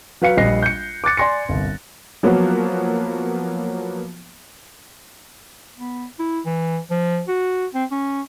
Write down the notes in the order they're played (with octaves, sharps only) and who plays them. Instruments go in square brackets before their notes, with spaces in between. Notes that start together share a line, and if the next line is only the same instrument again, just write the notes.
[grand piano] F#3 B4 F5 C#7
A#1 G3 D#5 A#6 C7
G6 C#7
D6 F#6 A6 C#7
D5 G#5 C6 A#6 C#7
G1 C2
[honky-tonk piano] F3 F#3 A#3 B3 F#4
[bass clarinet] B3
E4
E3
F3
F#4
C4
C#4